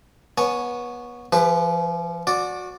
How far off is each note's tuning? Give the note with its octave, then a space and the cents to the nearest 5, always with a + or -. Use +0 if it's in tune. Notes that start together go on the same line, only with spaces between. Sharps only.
B3 -25 C#5 +0 G#5 +0
F3 -35 G4 +40 B4 +0
F#4 -25 D5 +0